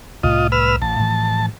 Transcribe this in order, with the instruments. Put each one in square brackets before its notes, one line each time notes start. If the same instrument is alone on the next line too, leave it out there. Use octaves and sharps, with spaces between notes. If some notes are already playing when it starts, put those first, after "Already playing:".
[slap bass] C2 A2 [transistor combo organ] F4 D#5
[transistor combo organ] B4 E6 F6
[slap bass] A1 [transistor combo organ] A5
[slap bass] A2 E3 F3